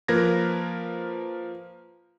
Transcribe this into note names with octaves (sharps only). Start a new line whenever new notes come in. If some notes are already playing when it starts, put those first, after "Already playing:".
F3 A#3 A#4 B4 G#6 A#6